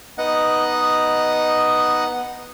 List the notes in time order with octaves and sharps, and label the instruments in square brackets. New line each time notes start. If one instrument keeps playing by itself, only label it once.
[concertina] B3 D#4 D#5 F#5